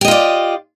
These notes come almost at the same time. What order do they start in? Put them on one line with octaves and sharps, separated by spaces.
G4 D#5 F4 D5